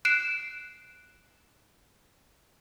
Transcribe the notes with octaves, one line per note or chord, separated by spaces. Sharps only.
F#6 C7 D7 E7